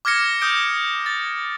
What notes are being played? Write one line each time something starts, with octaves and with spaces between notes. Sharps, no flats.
D6 F6 G#6 A#6 C#7
D#6 G6 D7
A6